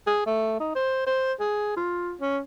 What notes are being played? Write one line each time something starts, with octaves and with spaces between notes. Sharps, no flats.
G#4
A3
D#4
C5
C5
G#4
F4
C#4